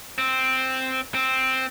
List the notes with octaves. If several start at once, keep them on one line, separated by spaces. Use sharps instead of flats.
C4
C4